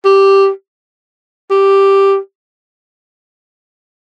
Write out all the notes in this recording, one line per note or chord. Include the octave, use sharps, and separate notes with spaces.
G4
G4